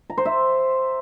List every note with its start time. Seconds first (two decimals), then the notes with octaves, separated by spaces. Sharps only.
0.10 A#5
0.18 C5
0.25 E5